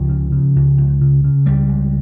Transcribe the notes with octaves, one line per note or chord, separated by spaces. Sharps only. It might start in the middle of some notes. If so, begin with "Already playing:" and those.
Already playing: C#2 F3
C#3
C#3
C#2
C#2
C#3
C#3
C#2 G3
C#2